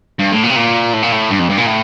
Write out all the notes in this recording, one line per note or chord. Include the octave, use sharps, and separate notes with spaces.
G2
A2
A#2
C3
A#2
A2
A#2
A2
G2
F2
G2
A#2
A2